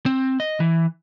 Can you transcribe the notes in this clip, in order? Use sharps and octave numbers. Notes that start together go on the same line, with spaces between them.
C4
D#5
E3